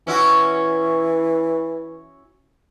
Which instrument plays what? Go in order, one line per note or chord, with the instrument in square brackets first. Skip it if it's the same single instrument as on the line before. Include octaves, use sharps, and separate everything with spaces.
[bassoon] E3 [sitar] C#4 E4 F#4